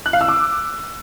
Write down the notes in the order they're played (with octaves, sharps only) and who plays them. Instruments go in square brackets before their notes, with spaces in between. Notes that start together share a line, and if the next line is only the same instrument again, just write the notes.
[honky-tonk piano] F#6
F5
E6
D6